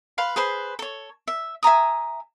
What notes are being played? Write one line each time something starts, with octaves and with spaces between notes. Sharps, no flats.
B4 F5 C6
G#4 B4 C5 B5
A4 C#5
E5
E5 G#5 A#5 D#6